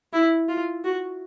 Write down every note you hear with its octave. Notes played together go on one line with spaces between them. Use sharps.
E4
F4
F#4